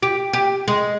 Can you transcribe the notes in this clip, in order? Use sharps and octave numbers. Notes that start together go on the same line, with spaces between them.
G4
G4
G#3